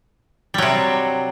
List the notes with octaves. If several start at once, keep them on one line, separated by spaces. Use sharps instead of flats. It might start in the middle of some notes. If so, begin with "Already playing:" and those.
C3 F#3 G3